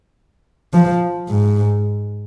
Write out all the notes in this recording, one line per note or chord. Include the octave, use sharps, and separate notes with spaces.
F3
G#2